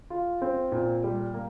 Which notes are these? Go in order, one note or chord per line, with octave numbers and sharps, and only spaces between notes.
F4
C4
A#2
G3
A#3